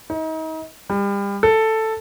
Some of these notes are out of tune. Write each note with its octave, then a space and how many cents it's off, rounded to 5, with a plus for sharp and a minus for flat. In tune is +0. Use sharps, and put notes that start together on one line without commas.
D#4 +35
G3 +35
A4 +5